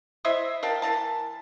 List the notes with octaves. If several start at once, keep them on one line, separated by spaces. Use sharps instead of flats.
E4 C5 D#5 E5
A#4 F5 G5 A5
E3 A#4 A5